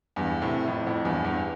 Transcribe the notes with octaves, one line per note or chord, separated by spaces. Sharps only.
E2 G2
A2 C3
F2 A2
F2 A2
E2 G2
E2 G2